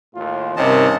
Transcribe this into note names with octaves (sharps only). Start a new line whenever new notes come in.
D#2 A2 F4
G2 C3 D#3 C#4 D#5 A5